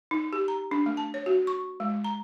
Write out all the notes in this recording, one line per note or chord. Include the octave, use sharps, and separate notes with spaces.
D#4
G4
A#5
D4
A3
A5
C#5
F#4
C#6
G#3
A#5